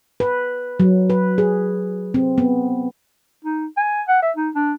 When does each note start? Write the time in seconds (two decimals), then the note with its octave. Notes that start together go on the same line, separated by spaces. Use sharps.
0.20 B4
0.80 F#3
1.10 B4
1.38 G#4
2.14 C4
2.38 B3
3.44 D#4
3.77 G#5
4.08 F#5
4.22 E5
4.37 D#4
4.55 D4